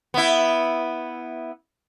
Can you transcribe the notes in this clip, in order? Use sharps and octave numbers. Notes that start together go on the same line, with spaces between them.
B3 E4